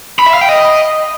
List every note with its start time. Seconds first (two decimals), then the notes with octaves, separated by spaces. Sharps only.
0.19 B5
0.26 E5
0.34 F5
0.41 G5
0.49 D#5